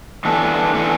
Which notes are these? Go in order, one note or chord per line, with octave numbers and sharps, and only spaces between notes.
E3 B3 D4 A4
E3 B3 D4 A4